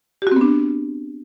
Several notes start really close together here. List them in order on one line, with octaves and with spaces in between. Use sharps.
G4 F#4 C4 B3 D4